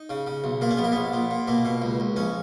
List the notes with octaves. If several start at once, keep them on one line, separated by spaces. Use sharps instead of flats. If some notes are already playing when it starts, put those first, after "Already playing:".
Already playing: D#4
C#3
C#3
B1
A#2 A#3
C#4
A#1 B3
A#3
A#1 B3
A#2
A#2
B2 A#3
B2
C#2
C#2
A#1 C#4